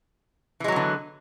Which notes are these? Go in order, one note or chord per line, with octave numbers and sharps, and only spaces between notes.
D3 E3 F#3 G#3 B3